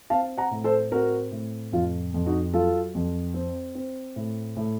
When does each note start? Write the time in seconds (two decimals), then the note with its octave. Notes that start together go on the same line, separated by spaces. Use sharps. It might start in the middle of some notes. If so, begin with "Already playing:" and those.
0.10 C4 F5 A5
0.38 F#5 A#5
0.51 A2
0.64 A4 C5
0.91 C4 F#4 A#4
1.32 A2
1.72 F2 F4
2.14 F2
2.26 D#4 F#4
2.54 F#3 F4 A4
2.95 F2
3.34 C4
3.75 C4
4.16 A2
4.57 A2